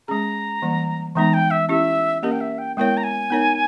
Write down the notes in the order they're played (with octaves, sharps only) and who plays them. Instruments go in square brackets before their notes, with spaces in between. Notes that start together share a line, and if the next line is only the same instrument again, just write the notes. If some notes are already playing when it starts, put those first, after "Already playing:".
[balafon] G#3 C#4 G#4 [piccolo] A#5
[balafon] E3 G3 A#3
[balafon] E3 G#3 B3 D#4 [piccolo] A#5
[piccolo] G5
E5
[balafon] C#4 E4 G4 [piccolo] E5
[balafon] A#3 C#4 G4 A#4 [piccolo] D#5
[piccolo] G5
E5
G5
[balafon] G#3 B3 E4 A#4 C#5 [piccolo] G5
[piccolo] A#5
G#5
[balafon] B3 D#4 A#4 C#5